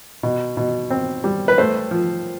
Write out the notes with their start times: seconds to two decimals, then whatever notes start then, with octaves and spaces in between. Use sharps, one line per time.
0.23 B2
0.57 B2
0.90 C4
1.24 G3
1.48 B4
1.58 A3 C5
1.91 F3